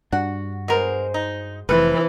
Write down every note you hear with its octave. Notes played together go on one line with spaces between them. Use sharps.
G2 D4 F#4 F#5
B2 G#3 A#4 C5
D#4
F1 C3 E3 F4 A4 B4